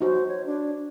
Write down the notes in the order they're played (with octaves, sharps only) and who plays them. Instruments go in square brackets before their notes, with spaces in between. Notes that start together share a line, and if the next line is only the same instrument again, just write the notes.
[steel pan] D#4 F#4 [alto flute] C5
[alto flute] C#5
D4